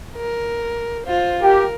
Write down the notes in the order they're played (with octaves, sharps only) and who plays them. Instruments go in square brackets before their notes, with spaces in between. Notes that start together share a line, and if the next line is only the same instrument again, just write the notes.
[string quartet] A#4
F4 C5
[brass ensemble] G4 [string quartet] A#4